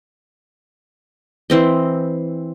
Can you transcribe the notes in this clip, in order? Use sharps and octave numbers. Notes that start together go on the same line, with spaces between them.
E3 C4 D#5